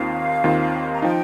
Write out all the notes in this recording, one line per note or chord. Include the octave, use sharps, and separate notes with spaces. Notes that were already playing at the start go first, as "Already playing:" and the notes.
Already playing: D#2 D#3 C4 F4 F5
D#2 D#3 C4 F4
A#5
F3 D#4 G5